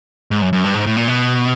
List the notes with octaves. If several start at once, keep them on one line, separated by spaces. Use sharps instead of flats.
G#2
F#2
F#2
G2
G#2
A2
A#2
B2